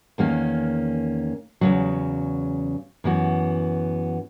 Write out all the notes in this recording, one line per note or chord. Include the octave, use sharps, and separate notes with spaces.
E2 D#3 A#3 C#4
E2 C#3 F#3
F#2 E3 B3 F#4